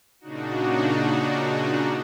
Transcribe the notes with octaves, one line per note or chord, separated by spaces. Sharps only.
A#2 C#3 D4 D#4 F#4